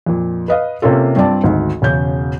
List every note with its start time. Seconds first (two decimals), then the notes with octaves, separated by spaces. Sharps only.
0.06 F2 A#2
0.48 B4 D#5 F5
0.82 C3 A#3 C#4 F4 A4
1.16 G2 C4 F4 D5 A5
1.44 G#1 D2 G#2
1.82 E1 C#3 C#4 G6